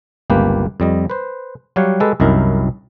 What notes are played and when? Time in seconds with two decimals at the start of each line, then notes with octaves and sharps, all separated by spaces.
0.30 G1 C#2 A#3 G4 B4
0.80 F2 G3 D#5
1.10 B4 C5
1.76 F#3 G3 G4 C#5 F5 F#5
2.00 G#3 G4 A4 B4
2.20 C2 F#2 D#4 E4 A#4